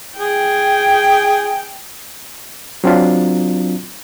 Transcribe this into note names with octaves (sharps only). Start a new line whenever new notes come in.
G#4 G5
F#3 C4 D4 F4